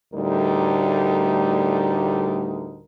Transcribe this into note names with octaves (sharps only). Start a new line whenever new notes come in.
D2 A2 G3 D#4 A#4